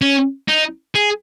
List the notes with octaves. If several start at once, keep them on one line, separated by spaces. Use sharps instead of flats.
C#4
D#4
G#4